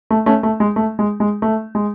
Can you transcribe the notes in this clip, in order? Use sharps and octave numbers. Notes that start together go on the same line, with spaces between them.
A3
A3 C#4
A3
G#3
A3
G#3
G#3
A3
G#3